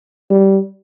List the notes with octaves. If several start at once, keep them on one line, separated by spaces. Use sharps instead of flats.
G3